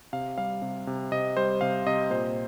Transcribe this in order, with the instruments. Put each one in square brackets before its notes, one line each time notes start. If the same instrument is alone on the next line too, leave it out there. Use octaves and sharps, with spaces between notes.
[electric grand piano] C3 F5
G3 F5
C3
C3
C3 D#5
G3 C5
C3 F5
C3 D#5
A#2 C5